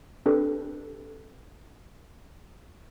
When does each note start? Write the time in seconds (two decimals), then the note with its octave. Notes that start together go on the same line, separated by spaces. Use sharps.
0.26 C4 D4 G4 A4 B4